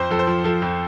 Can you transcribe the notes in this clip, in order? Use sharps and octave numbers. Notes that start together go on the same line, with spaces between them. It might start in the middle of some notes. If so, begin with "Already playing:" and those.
Already playing: F2 F3 C5
F2 A4
C5
F3
F3 A4
F2